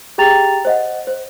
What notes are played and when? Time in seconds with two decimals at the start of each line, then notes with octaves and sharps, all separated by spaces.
0.18 G4 G#4 G5 A#5 A6 F7
0.65 C5 D#5 F#5
1.07 C5